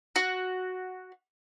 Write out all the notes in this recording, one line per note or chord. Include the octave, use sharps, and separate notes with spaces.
F#4